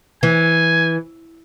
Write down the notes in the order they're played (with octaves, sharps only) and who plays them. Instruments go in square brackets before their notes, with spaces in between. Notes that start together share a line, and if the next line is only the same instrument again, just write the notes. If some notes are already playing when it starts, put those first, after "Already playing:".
[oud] E3 [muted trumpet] G#5